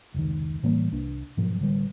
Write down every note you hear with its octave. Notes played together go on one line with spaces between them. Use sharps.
F1 C#2 D#3
A2 E3 G3 A#3
C2 D4
G#2 B2 F3 F#3
A1 D3 G3